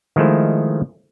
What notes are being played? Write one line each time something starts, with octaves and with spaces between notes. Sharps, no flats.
D#3 F3 G#3 A3 E4 C5